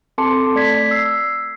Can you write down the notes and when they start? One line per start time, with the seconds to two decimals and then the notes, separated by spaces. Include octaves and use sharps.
0.18 C4 A4 A5 C6 D6 C#7
0.55 A3 D5 G#6 B6
0.91 E6 C7